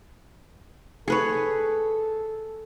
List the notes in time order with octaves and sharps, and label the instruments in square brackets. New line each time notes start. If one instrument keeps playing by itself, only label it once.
[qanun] G#4 B4 C#5 [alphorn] A4